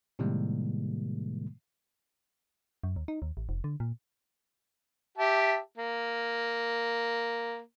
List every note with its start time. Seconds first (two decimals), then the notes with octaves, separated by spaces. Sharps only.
0.19 A2 C3 D#3 G3 G#3 A#3
2.84 F#2
2.96 D#2
3.08 D#4
3.22 D#2
3.37 A1
3.49 F1
3.64 D3
3.80 A#2
5.18 G4 E5 A5
5.78 A#3